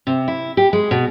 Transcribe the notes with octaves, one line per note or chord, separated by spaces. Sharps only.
C3
E4
G4
G#3
B2